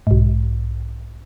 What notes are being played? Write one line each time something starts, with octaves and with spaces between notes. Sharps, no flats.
B1 G#2